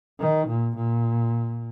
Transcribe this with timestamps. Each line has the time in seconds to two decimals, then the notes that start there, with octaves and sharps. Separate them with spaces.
0.20 D#3
0.48 A#2
0.76 A#2